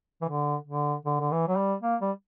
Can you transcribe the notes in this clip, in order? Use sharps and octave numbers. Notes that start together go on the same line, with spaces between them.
E3
D3
D3
D3
D3
E3
F#3
G3
A#3
G3